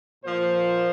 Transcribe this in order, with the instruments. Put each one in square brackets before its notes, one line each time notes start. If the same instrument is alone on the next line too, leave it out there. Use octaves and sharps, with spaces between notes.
[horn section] A#2 F3 C5